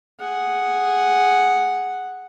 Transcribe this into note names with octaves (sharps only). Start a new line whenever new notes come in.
G#4 F#5